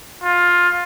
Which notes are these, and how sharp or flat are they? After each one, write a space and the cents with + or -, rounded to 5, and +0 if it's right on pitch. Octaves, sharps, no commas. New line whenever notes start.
F4 +15